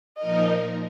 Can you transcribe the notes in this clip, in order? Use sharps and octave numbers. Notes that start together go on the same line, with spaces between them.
A#2 F3 D#4 A#4 D#5